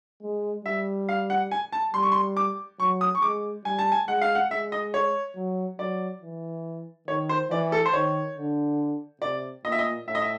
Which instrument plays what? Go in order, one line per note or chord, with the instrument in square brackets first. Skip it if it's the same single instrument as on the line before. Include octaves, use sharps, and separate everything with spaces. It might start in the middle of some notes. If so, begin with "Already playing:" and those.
[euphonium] G#3
[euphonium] G3 [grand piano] E5
[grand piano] F5
F#5
G#5
A5
[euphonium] G3 [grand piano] C6
[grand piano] C#6
C6
D6
[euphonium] F#3 [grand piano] C#6
[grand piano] D#6
C#6
[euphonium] G#3 [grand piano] D6
[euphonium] G3 [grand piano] G#5
[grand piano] A5
G#5
[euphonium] G#3 [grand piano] F#5
[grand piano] F5
F#5
[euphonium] G#3 [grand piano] E5
[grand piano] D#5
C#5
[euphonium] F#3
[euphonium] F#3 [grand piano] D5
[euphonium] E3
[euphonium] D#3 [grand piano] C#5
[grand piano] C5
[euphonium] E3 [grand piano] D5
[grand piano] A4
C5
[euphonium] D#3 [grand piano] C#5
[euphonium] D3
[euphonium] C3 [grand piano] D5
[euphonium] A#2 [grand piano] D#5
[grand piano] E5
D#5
[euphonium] A2 [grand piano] E5
[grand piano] D#5
E5